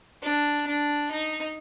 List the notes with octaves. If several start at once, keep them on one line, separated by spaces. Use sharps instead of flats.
D4
D4
D#4